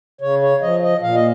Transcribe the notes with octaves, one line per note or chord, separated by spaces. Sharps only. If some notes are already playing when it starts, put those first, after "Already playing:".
C#3 C#5
C#5
F3 D#5
D#5
A#2 F5
D#5